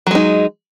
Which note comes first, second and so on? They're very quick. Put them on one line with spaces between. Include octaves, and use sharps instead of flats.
F#3 G#3 D#4